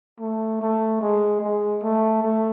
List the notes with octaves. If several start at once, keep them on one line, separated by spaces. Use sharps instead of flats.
A3
A3
G#3
G#3
A3
A3